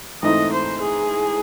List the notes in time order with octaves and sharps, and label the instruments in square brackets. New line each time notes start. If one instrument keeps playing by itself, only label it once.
[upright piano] G#2 E3 A3 C4 D#4 [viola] D#5
[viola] C5
G#4